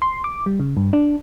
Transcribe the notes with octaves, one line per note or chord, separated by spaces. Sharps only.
C6
D6
G3
C#3
G2
D4